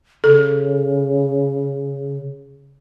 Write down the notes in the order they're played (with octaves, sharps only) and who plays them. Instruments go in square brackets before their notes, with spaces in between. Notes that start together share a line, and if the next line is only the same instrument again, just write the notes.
[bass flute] C#3 [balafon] A4